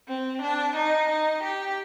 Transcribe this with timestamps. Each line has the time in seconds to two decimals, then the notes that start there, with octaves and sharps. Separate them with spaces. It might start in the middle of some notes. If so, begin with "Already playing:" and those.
0.08 C4
0.42 D4
0.76 D#4
1.09 D#4
1.43 G4